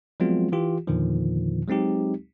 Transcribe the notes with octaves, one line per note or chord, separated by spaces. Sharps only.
F3 F#3 G#3 B3 C4 F4
E3 F4 G4
E2 A#2 D3 D#3 F3
F#3 G#3 C4 D#4 G4